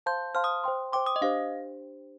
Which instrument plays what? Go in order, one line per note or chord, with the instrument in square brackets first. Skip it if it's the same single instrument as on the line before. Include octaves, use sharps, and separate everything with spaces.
[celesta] C5 F5 A5 C6 [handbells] G6
[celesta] C5 F5 A5 C6 [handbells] F6
[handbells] D#6
[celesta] C5 G5 C6
[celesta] C5 G5 C6 [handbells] D6
[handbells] D#6
D#5
[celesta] D4 G4 C5 [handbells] F5